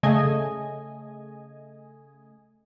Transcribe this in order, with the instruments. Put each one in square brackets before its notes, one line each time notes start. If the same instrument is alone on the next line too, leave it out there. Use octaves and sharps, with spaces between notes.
[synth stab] C#3 A3 D#5 G#5